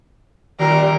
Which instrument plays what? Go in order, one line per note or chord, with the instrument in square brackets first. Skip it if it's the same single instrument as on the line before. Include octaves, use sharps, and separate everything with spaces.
[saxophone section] F#2 A#2 G3 [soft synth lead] D#3 [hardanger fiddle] A#4